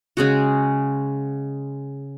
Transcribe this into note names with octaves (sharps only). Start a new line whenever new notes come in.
C#3 G#3 F#4